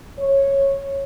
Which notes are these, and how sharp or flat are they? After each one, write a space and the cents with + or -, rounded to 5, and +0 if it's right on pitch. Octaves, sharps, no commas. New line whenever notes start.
C#5 -15